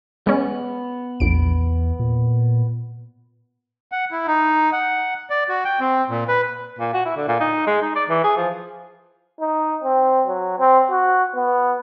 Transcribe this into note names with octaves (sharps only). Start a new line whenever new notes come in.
G#3 B3 C#4
A#1 E2 D7
A#2
F#5
E4
D#4
F#5
D5
F#4
G5
C4
A#2
B4
A#2
F#4
E4
D3
A#2
D#4
G#3
D#4
D5
E3
G#4
F3
D#4
C4
F#3
C4
F#4
B3